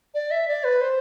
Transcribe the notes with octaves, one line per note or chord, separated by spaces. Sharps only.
D5
E5
D5
B4
C5